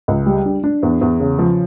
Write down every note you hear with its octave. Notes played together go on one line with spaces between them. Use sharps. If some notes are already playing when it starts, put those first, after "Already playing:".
C#2
G3
D4
D4
E2
E2
C#3
F3